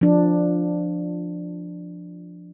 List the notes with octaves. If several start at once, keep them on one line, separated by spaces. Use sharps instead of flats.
F3 D4